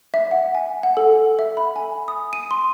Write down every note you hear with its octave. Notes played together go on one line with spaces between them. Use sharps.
E5
F#5
G#5
F#5
A4
F#5
E5
B5
G#5
D#6
D#7
C6